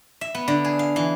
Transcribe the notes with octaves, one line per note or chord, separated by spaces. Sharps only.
E5
B3
D3
G#4
F5
E3